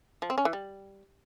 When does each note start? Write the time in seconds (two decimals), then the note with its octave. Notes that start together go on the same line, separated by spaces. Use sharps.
0.22 F3
0.30 C4
0.38 C#4
0.45 E3
0.53 G3